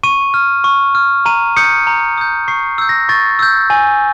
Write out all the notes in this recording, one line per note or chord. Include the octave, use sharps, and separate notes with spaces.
C#6 D#7
F6
C#6
F6
A#5 D#7
D#6 G6 C#7
A#5
D#6 G6
C#6 C7
E6 G6
A#6
C#6 A6
E6 G6
G#5